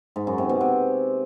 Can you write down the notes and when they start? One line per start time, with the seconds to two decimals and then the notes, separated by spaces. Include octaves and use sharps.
0.16 G#2
0.27 F#2
0.38 C3
0.49 B2
0.61 C3